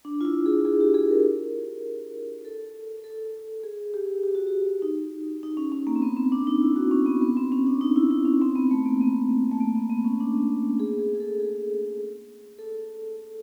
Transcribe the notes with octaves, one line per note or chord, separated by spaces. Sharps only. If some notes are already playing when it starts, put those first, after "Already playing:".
D4
F4
E4
G#4
G#4
G4
G#4
A#4
A4
A4
G#4
G4
G4
F#4
G4
D#4
D#4
C#4
C#4
A#3
C4
B3
C4
D4
D#4
E4
F#4
C#4
B3
B3
C4
C#4
D4
D#4
E4
D#4
C#4
C4
B3
A3
A#3
B3
A3
A#3
B3
B3
C#4
D4
G#4
G#4
G#4
A4
G#4
A4